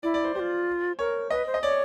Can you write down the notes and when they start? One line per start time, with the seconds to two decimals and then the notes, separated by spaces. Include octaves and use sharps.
0.03 E4 D5
0.14 D5
0.24 C5
0.35 G4 C5
0.40 F4
0.99 A#4 C#5
1.30 B4 D#5
1.47 C5
1.54 D#5
1.62 C#5 D5